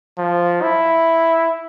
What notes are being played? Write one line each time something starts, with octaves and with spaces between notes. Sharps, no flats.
F3
E4